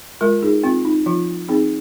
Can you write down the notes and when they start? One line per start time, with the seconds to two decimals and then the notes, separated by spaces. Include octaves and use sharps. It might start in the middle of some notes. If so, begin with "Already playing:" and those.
0.21 G#3 F4 A#4
0.42 D#4 G#4
0.63 C4 F4
0.85 D#4
1.06 F3 F4
1.49 C4 D#4 G#4